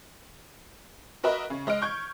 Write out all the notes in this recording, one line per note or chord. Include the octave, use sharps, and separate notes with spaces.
F#4 A#4 B4 D#5 E5
C#3
G#3 D#5 F6 D7
C#6 G6 G#6